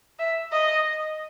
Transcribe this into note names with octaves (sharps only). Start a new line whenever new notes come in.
E5
D#5